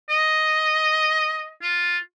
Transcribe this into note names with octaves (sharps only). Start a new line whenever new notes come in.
D#5
F4